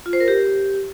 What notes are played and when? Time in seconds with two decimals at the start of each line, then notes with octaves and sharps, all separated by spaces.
0.06 F4
0.13 C5
0.20 A#4
0.28 G4